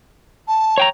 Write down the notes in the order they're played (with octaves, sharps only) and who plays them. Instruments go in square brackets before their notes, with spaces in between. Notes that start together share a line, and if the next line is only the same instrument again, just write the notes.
[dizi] A5
[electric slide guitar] C#5 G5 A#5